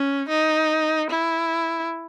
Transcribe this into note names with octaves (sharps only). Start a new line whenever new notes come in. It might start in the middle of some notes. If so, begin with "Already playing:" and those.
Already playing: C#4
D#4
E4